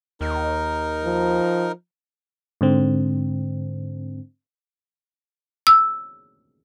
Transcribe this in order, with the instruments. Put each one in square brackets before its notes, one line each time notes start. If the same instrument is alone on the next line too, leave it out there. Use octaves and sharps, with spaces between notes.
[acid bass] D#2 [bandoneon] D#4 A#4
[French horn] F3
[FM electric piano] G#2 D3 C4
[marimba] E6